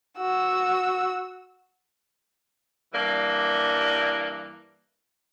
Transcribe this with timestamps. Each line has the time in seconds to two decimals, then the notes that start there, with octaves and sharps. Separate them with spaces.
0.18 F#4 E6
2.94 G2 E3 G3 A#3 D5